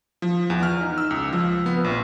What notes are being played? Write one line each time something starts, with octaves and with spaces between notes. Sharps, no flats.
F3
E2
F6
D#4
E6
C#2
F3
B3
A#1